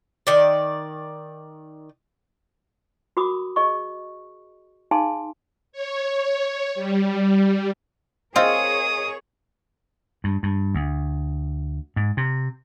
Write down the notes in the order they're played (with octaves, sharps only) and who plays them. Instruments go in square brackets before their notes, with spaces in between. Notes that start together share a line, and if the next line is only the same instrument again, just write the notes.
[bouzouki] D#3 D5
[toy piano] F#4 A#4 B5 D6 D#6
G#4 D#5 C#6
D#4 G#4 F5 G#5 A5 C6
[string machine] C#5
G3
[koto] C4 F4 [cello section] G#4 A#4 C#5 [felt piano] D#5 [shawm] D#6
[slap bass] G2
G2
D2
G#2
C3